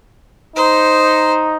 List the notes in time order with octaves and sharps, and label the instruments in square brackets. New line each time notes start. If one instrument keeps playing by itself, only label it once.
[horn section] D#4 [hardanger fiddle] C5